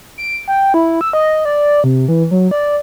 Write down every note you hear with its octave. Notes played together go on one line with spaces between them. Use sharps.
D7
G5
E4
E6
D#5
D5
C3
E3
F#3
D5